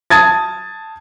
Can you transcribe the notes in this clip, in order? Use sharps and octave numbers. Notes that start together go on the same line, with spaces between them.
A5 D#6 G#6 A6